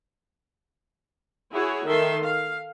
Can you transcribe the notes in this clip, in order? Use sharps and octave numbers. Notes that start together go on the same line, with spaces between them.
E4 F#4 G#4 C#5
D#3 A4 E5 C6
F5